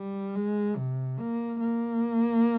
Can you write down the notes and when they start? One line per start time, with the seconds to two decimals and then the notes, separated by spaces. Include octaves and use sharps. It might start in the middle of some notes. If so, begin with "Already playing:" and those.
Already playing: G3
0.35 G#3
0.77 C3
1.18 A#3
1.60 A#3